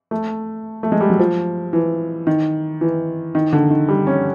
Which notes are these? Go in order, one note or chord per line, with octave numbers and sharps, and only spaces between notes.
A3
A3
G#3
G3
F#3
F3
E3
D#3
E3
D#3
D3
D#3
G3
C#4